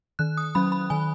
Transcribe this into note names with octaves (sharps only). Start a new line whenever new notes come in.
D#3 F#6
D#6
F#3 C#4 B5
B5
D#3 G#5